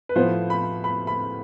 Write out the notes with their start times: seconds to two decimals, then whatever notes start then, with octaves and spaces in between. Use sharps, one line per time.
0.09 B4
0.16 A2 F3 B3 C5
0.50 B5
0.84 B5
1.07 B5